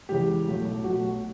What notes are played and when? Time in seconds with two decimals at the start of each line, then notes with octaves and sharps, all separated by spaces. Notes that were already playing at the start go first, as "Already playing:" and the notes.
0.09 E2 C#3 E3 G#3 G4
0.47 B1 B2 F#3 A3
0.84 B1 B2 F#3 A3 F#4